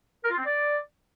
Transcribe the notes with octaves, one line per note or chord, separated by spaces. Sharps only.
A#4
F4
C4
D5